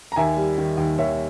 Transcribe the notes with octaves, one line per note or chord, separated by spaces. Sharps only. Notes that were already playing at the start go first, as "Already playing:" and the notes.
A#5
D#2 E5 G#5
G3
D#3
D#2
D#2 C#5 E5